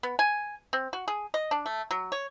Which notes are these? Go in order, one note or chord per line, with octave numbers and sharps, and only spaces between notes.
B3
G#5
C4
F#4
G#4
D#5
D4
A3
F#3
C#5